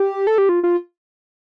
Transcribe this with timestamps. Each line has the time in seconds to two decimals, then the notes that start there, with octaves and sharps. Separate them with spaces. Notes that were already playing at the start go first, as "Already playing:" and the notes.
Already playing: G4
0.27 A4
0.38 G4
0.49 F4
0.63 F4